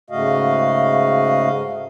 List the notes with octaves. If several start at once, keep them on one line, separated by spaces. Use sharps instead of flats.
G#2 C#3 A3 F#4 D#5 F5